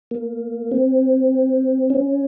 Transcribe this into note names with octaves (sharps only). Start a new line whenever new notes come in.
A#3
C4
C#4